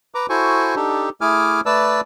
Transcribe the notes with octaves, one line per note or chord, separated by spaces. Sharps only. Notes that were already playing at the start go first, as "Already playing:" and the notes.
B4 A#5 D6
E4 F#4 A4 C5 G#5 C#6
D4 D#4 G4 A4
A3 E4 G#4 G#5 D6 F6
A3 B4 D5 A5 E6